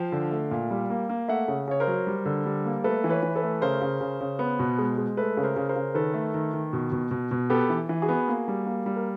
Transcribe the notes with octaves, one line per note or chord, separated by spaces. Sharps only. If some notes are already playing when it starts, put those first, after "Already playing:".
Already playing: F3 F5 G5
D3
A3
A#2
G3
A#3
A#3
A3 E5 F#5
C#3
C#3 C#5
A#4 C5
F#3
G3
D3
G3
A#3
A3 A4 B4
E3
B4 C#5
E3
A4 B4
A3
C#3 A#4 C5
C#3
C#3
C#3
B3
B2
G#3
G#3
A3 A4 B4
C#3
A#4 C5
C#3
A#4 C5
C#3
D#3 A4 B4
A3
D#3
D#3
B2
B2
B2
B2
B3 G4 A4
E3
E3
F#4 G#4
B3
A#3
G3
A#3
G3
A#4